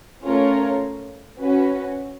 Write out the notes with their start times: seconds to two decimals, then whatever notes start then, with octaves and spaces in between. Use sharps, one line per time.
0.23 A3 C#4 F4 A#4 C#5
1.40 C#4 F#4 B4